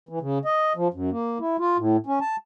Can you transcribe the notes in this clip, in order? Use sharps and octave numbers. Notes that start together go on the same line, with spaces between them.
E3
C#3
D#5
F3
F#2
A#3
E4
F4
A2
C#4
A5